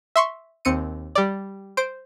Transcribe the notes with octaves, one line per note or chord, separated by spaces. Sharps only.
E5 C6 C#6
D#2 C4 C#7 D#7
G3 D5
C5 D7